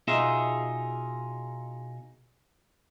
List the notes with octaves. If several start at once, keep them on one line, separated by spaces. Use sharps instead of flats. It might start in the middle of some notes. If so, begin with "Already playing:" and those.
B2 D#4 F4 G#4 E5